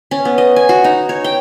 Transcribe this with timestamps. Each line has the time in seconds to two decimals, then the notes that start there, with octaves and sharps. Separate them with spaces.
0.11 C#4
0.25 B3
0.38 D#5
0.56 G#5
0.69 F#4
0.84 D#4
1.09 C#5
1.24 G5